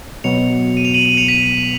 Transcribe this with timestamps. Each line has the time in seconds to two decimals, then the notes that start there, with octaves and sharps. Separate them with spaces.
0.24 B2 F#3 B3 C#7 F7
0.77 D#7
0.85 F7
0.94 D#7 F#7
1.05 D#7 F#7
1.17 C#7 F7
1.28 B6 D#7